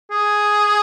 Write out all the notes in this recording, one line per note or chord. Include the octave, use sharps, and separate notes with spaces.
G#4